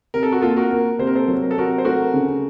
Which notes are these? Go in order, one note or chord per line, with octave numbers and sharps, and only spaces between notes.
C3 A#4
A4
F#4
A#3 F4 A4
F#4 A#4
A#3
C3 C5
A#4
A4 C5
F#3
A#4
A4
C3 F#4 A#4
C5
A3 F#4 A#4
C#3